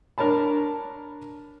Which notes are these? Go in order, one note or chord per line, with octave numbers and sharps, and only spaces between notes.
D4 A#4 C#5 A5 B5